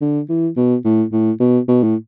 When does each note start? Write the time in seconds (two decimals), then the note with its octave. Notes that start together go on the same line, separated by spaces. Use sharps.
0.02 D3
0.29 E3
0.57 B2
0.85 A2
1.13 A2
1.40 B2
1.68 B2
1.83 A2